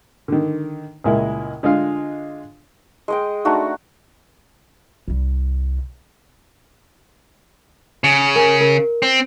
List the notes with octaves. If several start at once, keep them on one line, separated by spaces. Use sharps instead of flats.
D3 D#3
C#2 A#2 G#3 A#3 E4
D3 G#3 D4 F4 F5
G#3 D#5 G5
A3 D4 D#4 F#4
C2 G3
C#3
A#4 G#5
A#4
C4